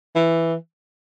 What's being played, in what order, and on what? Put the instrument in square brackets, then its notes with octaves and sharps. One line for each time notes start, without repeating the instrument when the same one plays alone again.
[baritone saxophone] E3